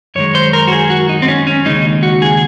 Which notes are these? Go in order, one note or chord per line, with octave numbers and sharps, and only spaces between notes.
F#2 D#3 G#3 C#5
C5
A#4
F#4
G#4
F#4
D#4
C4
C#4
C#4
D#2 C#3 G#3 D#4
F#4
G#4